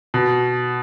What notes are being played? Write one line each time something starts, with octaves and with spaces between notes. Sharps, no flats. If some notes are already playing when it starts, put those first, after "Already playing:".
B2